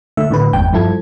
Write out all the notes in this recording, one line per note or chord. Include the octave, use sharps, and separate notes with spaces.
D3 A3 E5
A2 D3 B4
G1 E2 G#2 G5 G6
G2 F3 E4 A4 G#6